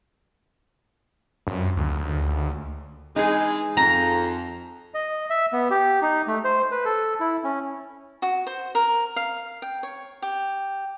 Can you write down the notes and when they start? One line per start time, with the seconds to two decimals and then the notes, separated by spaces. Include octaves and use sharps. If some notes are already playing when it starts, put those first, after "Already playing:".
1.47 F#2
1.77 D2
3.16 E3 G#3 D#4 G#4
3.77 F2 A#5
4.94 D#5
5.30 E5
5.53 B3
5.70 G4
6.02 D#4
6.27 A3
6.45 C5
6.71 B4
6.85 A4
7.20 E4
7.44 C#4
8.22 F#4
8.47 C5
8.75 A#4
9.16 F5
9.62 G5
9.83 C#5
10.22 G4